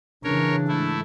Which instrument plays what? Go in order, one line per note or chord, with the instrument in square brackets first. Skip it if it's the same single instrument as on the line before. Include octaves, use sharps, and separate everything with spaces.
[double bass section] C#3 E3 [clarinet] D4 [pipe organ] A#4 C#5
[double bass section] G#2 [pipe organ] A3 E4